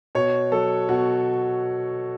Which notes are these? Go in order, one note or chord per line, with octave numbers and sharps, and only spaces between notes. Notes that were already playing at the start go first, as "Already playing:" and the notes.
B2 C#5
F#3 A4
B2 F#4